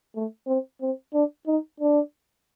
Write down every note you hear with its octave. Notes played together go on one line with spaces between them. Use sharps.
A3
C4
C4
D4
D#4
D4